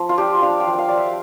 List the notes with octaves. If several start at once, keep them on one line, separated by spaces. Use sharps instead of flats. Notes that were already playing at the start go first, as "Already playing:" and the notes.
Already playing: F3
F4
D4 G4
D4 F5
G5
F3
G5
F5
F3 D5
E5